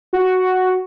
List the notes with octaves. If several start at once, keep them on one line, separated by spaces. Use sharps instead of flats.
F#4